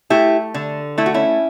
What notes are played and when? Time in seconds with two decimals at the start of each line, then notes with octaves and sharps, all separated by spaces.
0.10 A3 E4 G4
0.54 D3
0.98 A3 E4
1.06 F#4
1.14 C#4 E4